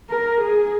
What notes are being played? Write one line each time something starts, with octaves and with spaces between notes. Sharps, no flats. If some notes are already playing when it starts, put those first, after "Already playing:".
A#4
G#4